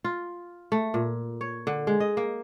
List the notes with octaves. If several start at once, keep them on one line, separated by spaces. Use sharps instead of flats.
F4
A3
A#2
C#5
D3
G#3
D#5
A#3